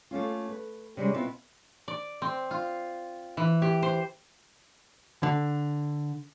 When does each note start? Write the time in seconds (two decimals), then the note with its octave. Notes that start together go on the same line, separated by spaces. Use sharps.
0.11 A3 A#3 C#4 F4
0.49 B4
0.97 C3 G3 G#3 C#4
1.14 B2 B3 C4 E4 F4
1.88 D5
2.22 C4
2.51 F4
3.37 E3
3.62 G4
3.83 C5
5.23 D3